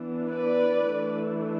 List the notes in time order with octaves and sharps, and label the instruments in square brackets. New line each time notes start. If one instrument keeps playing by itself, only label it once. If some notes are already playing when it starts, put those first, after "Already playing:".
Already playing: [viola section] E3 B3 D4
B4 D5
E3 A3 D4